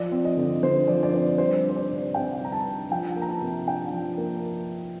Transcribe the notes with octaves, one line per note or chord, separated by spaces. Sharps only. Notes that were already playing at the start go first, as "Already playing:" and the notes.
Already playing: F3 D5
C4
D#5
D3
D3 C5
F3 D5
D5
C4 C5
G3 C5
D4
C5
D5
C3
C3 G5
G3 A#5
A5
D4
F3 G5
A#3
A#5
A5
C3
D4 G5
F3
A#3